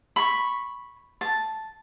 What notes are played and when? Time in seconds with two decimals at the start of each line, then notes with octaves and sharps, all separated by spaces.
0.16 B5 C#6
1.21 A5